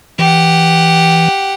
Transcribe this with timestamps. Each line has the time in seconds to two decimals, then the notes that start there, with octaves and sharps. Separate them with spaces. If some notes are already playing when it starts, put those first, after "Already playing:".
0.19 E3 G4 F#5